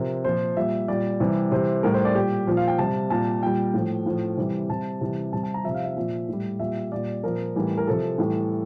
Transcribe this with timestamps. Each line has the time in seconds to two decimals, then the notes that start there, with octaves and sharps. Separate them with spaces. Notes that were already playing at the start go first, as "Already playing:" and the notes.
Already playing: C3 F3 A#4
0.25 A#2 F3 C5
0.57 A#2 G3 E5
0.88 A#2 G3 D5
1.20 C3 E3 G3
1.52 C3 E3 G3 C5
1.83 A2 G3 A#4
1.94 C5
2.05 D5
2.15 A#2 G3 G4
2.47 A#2 F3
2.57 F5
2.68 G5
2.79 C3 G3 A5
3.10 A#2 G3 A5
3.43 A#2 G3 G5
3.74 A2 F3
4.06 A2 F3
4.37 C3 E3 G3
4.70 C3 G3 A5
5.01 C3 E3 G3
5.33 C3 G3 A5
5.43 A5
5.54 A#5
5.64 C3 F3 E5
5.74 F5
5.84 E5
5.96 A#2 F3
6.28 A2 G3
6.59 A#2 G3 E5
6.92 A#2 G3 D5
7.24 A#2 F3 A#4
7.56 A2 E3 G3
7.77 A#4
7.87 C3 F3 A4
8.18 A2 E3 G3